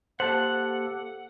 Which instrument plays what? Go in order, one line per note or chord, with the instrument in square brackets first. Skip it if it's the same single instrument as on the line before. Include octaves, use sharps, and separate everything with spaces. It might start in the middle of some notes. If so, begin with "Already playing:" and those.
[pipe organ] A#3 G4 A4 [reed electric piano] C5 A5 [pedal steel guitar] F#5